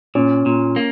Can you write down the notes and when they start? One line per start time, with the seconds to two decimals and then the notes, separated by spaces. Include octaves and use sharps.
0.15 A#2 C#4
0.46 A#2
0.76 A#3